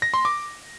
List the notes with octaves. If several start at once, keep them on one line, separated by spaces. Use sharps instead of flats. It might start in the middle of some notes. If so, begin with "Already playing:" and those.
A#6
C6
D6